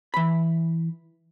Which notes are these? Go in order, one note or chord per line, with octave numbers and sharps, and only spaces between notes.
E3 B5